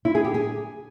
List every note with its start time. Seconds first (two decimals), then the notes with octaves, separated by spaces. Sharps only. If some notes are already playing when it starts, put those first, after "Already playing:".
0.05 E4
0.15 G#4
0.25 G4
0.34 G#4